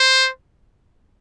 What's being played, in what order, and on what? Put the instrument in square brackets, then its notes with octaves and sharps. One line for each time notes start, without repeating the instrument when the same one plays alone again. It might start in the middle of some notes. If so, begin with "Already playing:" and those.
Already playing: [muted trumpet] C5